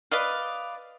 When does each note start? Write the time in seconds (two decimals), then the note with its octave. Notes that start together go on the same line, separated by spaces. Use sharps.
0.11 B4 D5 D#5 F5